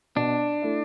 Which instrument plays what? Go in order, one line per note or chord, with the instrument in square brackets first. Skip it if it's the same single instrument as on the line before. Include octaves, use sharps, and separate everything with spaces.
[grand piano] B2 [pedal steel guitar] D4
[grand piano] A3 E4